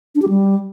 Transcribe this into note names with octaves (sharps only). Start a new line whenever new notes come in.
D4
G4
G3